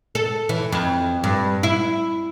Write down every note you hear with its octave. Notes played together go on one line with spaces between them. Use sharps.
A4
E3
F2
G2
E4